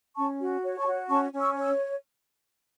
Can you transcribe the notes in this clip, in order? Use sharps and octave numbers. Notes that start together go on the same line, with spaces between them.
C#4 A5 C#6
F#4
C#5
A5 C#6
F#4
C#4 A5 C#6
C#4
C#6 E6
C#5
E6